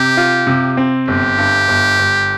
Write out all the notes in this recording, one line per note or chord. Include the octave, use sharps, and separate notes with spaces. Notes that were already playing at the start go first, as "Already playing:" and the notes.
Already playing: C3 G4
F4
C3
C4
G1 G4
G2
G1
G1